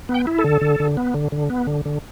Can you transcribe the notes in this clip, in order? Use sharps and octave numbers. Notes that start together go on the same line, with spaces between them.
B3
G5
E4
A4
D3
D3
D3
B3
D3
D3
B3
D3
D3